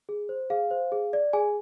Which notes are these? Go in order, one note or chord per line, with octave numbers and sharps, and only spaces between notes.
G#4
C5
G#4 F5
C5
G#4
D5
G#4 G#5